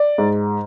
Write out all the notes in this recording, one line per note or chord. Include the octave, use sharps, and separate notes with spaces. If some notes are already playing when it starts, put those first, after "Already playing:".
Already playing: D5
G#2